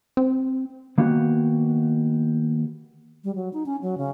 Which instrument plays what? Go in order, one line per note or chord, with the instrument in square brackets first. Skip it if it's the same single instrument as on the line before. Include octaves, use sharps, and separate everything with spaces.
[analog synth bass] C4
[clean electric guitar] D#3 A#3 B3 F#4 G4
[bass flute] G3
F#3
D#4
C#4
F#3
C#3